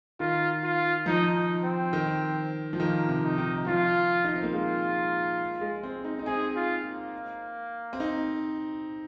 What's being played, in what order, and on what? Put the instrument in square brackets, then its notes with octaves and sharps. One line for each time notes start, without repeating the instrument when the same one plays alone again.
[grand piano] D#3 [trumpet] F4
[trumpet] F4
[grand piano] F3 [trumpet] D#4
[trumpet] D#4
C4
[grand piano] D#3
F3
[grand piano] D#3 [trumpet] A#3
[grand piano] C3
[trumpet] D#4
[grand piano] D#3
[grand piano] F3 [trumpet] F4
[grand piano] D#4
C4
A#3
[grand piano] G#3 [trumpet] F4
[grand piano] G#3
C4
D#4
D#4
[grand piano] C4 [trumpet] G#4
[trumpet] F4
A#3
[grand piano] C4
D#4